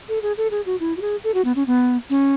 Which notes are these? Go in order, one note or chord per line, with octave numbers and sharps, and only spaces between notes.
A4
G#4
A4
G#4
F#4
E4
F#4
G#4
A4
F#4
B3
C#4
B3
C#4